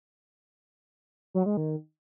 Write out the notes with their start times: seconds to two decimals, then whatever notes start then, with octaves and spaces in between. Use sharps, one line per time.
1.34 F#3
1.46 G#3
1.57 D#3